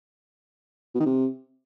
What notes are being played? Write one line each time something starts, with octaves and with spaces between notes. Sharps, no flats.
B2
D#3
C3